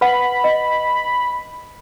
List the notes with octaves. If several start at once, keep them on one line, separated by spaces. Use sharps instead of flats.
B4 F#5 B5
D#5